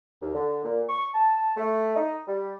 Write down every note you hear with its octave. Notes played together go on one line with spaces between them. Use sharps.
D#2
D3
A#2
C#6
A5
A3
D#4
G3